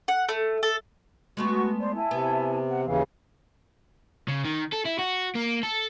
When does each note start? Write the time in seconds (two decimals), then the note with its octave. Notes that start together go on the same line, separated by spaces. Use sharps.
0.08 F#5
0.29 A3
0.63 A4
1.37 G#3 A3 B3 F#4 C#6
1.80 C5 D5
1.95 E4 G#5 A5
2.11 C3 B3
2.68 F#5
2.86 D#2 C#3 E3 F5
4.28 C#3
4.45 D#3
4.73 A4
4.86 E4
4.99 F#4
5.35 A#3
5.63 A4